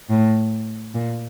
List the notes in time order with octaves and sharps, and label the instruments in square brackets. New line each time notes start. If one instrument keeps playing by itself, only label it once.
[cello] A2
A#2